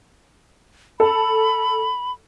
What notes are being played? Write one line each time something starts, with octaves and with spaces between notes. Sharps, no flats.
A4 B5